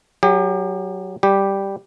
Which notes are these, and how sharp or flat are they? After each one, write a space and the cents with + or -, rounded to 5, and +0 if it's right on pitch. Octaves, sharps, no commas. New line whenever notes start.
F#3 +10 G4 +35
G3 +0 G4 +0